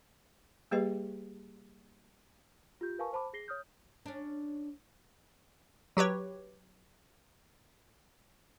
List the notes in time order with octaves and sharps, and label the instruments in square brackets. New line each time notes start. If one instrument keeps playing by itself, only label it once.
[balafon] G3 A#3 G4 G#4 B4 D#5
[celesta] F4 G4 G6
A#4 B4 F5 G#5 A5 C#6
C5 A5 B5 D6
G#4 A#6 C7 G7
C#5 D#6 F6 G6
[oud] C#4 D4
[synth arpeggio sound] F#3 G4 B4 C#5